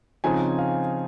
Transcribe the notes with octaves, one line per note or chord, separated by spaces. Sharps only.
C#3 F3 C4 D#4 G#5
F5